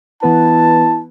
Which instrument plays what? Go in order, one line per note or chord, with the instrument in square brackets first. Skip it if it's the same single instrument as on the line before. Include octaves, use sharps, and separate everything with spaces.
[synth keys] E3 B3 B4 [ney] E4 [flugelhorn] A5